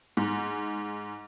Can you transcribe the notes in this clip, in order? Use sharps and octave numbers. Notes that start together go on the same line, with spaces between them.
G#2